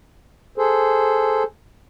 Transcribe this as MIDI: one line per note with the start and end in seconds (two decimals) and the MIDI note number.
0.58 1.43 68
0.58 1.43 69
0.58 1.43 72